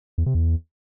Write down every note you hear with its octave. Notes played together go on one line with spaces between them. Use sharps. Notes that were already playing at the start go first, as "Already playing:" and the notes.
E2
C3
E2